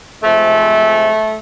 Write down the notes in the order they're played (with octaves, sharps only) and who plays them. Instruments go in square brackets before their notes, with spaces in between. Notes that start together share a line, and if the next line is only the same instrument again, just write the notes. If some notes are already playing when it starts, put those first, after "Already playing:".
[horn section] C3 F3 G#3 A3